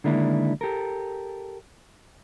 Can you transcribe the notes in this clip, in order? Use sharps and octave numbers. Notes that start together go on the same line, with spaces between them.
D3 D#3 G#3 A#3 D4 E4
G4 A4 A#4